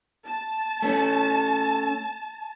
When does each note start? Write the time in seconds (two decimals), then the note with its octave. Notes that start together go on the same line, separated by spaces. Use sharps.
0.26 A5
0.82 A3 C#4